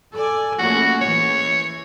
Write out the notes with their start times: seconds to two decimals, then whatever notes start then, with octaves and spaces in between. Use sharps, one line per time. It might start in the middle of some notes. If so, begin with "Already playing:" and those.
0.13 A4 D5 G#5
0.59 A#1 A3 C#4 F#4
1.01 E3 C#5